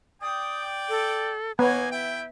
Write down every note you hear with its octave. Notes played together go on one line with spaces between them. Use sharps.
D5 G5 D#6
A4
A#3 B3 D#4 C#5 G#5
E4 E5 G5